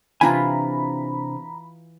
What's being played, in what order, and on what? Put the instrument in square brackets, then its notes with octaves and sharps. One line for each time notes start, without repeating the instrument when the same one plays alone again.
[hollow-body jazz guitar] C3 D4 G#5 [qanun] E3 F4 [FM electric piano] A#5 B5